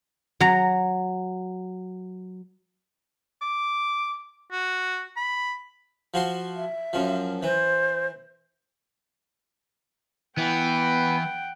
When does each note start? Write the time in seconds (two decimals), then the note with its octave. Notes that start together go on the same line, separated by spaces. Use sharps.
0.40 F#3 A#5
3.42 D6
4.52 F#4
5.17 B5
6.14 F3 F#4 C6
6.56 E5
6.93 F#2 F3
7.43 E3 C5
10.38 E3 B3 F#5 G5